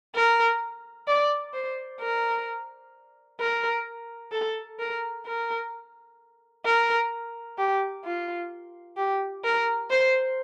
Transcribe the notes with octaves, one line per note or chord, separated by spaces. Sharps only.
A#4
D5
C5
A#4
A#4
A4
A#4
A#4
A#4
G4
F4
G4
A#4
C5